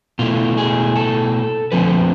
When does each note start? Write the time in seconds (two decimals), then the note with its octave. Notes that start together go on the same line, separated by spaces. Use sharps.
0.19 B2 A3 E4 F4
0.57 G#4
0.96 A4
1.72 F2 D3 F3 A3 C4 B4